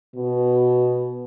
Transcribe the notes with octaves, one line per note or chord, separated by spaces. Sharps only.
B2